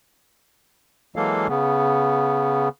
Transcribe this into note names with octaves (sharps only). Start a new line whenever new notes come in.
E3 F#3 G#3 A#3 A4 F5
C#3 B3